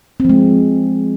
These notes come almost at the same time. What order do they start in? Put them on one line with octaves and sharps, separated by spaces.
C4 F3 G#3